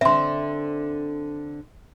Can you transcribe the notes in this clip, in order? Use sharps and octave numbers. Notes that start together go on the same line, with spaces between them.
D3 C4 E5 C6